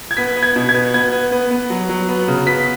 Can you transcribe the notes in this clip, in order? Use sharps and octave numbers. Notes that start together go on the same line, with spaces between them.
G#6
B3 B6
B3
G#6
B2
G#6
B3
B3 G#6
B3
B3
B3
F#3
F#3
B3
C#3
B3 B6